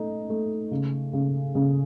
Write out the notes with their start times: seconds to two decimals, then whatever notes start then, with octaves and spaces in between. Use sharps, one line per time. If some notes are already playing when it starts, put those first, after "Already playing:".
Already playing: A3 D#4
0.30 A3
0.71 C#3
1.13 C#3
1.55 C#3